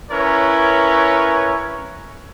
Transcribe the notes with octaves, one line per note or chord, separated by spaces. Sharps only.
C#4 E4 A#4 B4 C#5